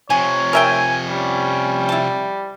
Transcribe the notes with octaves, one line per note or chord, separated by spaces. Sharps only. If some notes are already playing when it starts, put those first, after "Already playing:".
C3 F3 C#5 G#5
A#4 E5 G5 G#5
G3 C#4
E4 A5